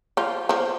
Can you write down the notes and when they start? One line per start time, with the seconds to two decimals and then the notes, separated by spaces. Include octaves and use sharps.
0.17 F3 F4
0.49 F3 F4